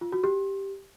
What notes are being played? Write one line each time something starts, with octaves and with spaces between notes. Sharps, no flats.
F4
F#4
G4